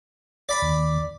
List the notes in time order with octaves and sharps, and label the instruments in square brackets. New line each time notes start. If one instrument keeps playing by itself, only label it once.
[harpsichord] D5 B5
[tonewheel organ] D#2